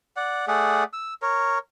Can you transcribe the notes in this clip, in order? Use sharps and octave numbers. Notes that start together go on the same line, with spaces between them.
D5 F#5
A3 G#4 D5 F#5
E6
A#4 C#5